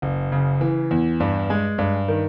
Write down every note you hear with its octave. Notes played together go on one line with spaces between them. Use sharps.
F#1
C#3
E3
E2
G2
G#3
G2
D#3